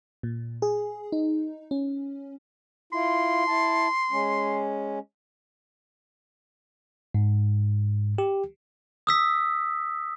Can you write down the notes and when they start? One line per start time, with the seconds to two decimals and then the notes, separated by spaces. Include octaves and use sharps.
0.23 A#2
0.62 G#4
1.12 D#4
1.71 C#4
2.93 E4 F4 C6
3.48 E4 A5
4.11 G#3 C#4
7.14 G#2
8.18 G4
9.07 D#6 E6 B6